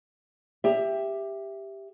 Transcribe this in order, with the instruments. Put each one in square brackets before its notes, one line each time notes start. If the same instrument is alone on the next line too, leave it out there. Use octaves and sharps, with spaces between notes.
[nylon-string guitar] G4 E5